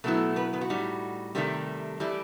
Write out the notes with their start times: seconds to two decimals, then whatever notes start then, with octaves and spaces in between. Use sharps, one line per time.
0.04 B2 F#3 A3 B3 E4 A4
0.36 B3 B4
0.53 B3 B4
0.61 F#4
0.70 A2 G3 D#4
1.35 C3 D#3 G3 A3 G4
2.00 E3 G3 A3 E4 G4